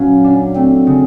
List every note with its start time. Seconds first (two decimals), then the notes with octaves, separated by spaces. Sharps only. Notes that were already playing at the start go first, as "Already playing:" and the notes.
Already playing: A#2 F#3 B3 C#4
0.24 D4
0.55 A3 C4
0.87 C#3